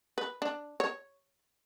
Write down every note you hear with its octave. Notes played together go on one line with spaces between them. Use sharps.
B4
D4
C#5